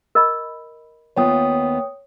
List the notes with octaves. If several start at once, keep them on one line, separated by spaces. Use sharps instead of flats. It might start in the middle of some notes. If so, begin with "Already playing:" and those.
A#4 D#5 B5
D#2 B3 F4 C#5 G5 D#6